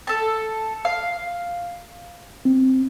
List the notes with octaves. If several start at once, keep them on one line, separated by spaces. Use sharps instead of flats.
A4 A5
F5
C4